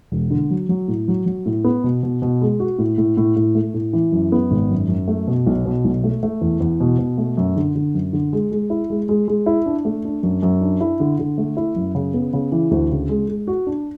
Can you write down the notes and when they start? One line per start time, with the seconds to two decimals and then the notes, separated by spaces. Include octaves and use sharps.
0.12 E1
0.30 D3
0.51 F#3
0.69 F#3
0.88 A2
1.08 F#3
1.26 F#3
1.46 A2
1.64 B3
1.84 B2
2.03 B2
2.22 B2
2.42 G#3
2.60 F#4
2.78 A2
2.98 A2
3.17 A2
3.36 A2
3.55 A3
3.74 A2
3.93 E3
4.12 F#2
4.32 B3
4.51 G#1
4.70 F#2
4.89 F#2
5.08 A3
5.27 B2
5.47 B1
5.65 B2
5.85 B1
6.04 A3
6.23 A3
6.41 E2
6.60 E2
6.80 B2
6.99 B2
7.18 A3
7.37 F#2
7.56 D3
7.75 D3
7.94 F#2
8.13 D3
8.33 G#3
8.51 G#3
8.70 E4
8.90 G#3
9.09 G#3
9.28 G#3
9.46 E4
9.66 D4
9.85 A3
10.05 D4
10.23 F#2
10.43 F#2
10.61 D4
10.81 E4
11.00 D3
11.19 D3
11.38 A3
11.57 E4
11.76 F#2
11.95 C#3
12.14 B3
12.33 C#3
12.52 E3
12.71 D2
12.90 C#3
13.09 G#3
13.28 G#3
13.47 F#4
13.67 D4